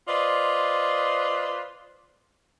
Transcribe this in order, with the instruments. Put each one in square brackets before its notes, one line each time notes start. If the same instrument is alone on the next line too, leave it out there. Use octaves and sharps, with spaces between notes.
[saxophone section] F4 B4 C5 D5 D#5